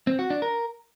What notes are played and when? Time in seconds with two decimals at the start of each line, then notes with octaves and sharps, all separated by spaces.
0.07 C4
0.19 F#4
0.30 D4
0.42 A#4